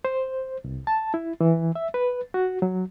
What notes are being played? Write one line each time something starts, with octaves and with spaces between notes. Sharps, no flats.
C5
C2
A5
E4
E3
E5
B4
F#4
F#3